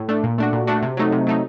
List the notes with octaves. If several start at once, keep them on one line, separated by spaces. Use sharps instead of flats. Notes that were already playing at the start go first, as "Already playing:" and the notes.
Already playing: A2
A3 D4
A#2
A3 D4 F#4
A#2
A3 D4 F#4
C3
F#3 A3 D#4
C3
F#3 A3 D#4